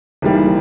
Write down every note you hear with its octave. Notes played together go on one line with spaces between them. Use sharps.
G#1 G#2 E3 G3 A#3